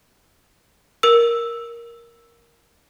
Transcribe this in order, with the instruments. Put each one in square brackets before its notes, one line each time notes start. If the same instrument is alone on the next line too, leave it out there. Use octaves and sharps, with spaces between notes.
[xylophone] A#4 E6